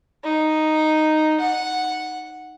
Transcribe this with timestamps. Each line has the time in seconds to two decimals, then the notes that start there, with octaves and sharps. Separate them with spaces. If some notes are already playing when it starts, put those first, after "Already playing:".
0.24 D#4
1.40 F#5